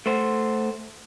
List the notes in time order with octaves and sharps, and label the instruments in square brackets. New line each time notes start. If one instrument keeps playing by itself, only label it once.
[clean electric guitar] A3 C5